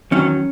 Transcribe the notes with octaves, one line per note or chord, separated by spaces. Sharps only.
E2 D#3 F#3 C#4